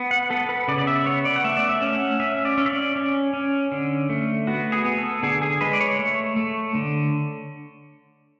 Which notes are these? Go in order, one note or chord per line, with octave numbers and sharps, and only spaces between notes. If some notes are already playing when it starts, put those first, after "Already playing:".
Already playing: B3
F#5
B3 A4
B4
C#3 D5
D5
E5
B3 C#5
D5
F#5
A3 E5
D5
E5
C#4
F#5
C#4 E5
D5
C#4
E5
D5
C#4
C#4
D3
A3
B3 F#4
G#4
B3
A4
D3 G#4
G#4
G#3 B4
D5
C#5
A3
A3
D3